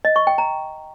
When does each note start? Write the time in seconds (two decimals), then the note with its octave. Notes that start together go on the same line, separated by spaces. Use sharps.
0.05 D#5
0.16 C#6
0.27 G5
0.38 A#5